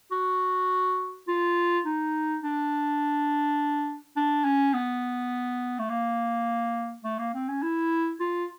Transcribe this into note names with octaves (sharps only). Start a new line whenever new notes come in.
F#4
F4
D#4
D4
D4
C#4
B3
A3
A#3
A3
A#3
C4
C#4
E4
F4